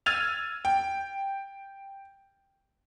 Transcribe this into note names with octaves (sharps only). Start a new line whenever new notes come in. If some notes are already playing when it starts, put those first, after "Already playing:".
E6 F6 G#6 A6 D#7 F7
G5